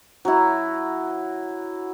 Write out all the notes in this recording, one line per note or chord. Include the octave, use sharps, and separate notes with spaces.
F#3 E4